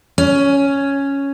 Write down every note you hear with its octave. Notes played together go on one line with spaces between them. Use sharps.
C#4